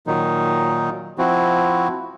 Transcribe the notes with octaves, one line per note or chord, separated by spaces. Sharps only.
A#2 D#3 F#3 D#4
F3 C4 E4 F#4